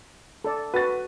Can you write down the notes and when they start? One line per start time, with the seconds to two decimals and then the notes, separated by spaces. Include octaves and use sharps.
0.44 A4 D5
0.74 F#4 B4 A6